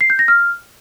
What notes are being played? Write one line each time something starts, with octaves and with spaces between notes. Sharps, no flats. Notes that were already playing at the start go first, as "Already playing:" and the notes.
C7
G6
A#6
F6